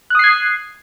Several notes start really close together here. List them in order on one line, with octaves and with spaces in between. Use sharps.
F#6 D#6 C7 G#6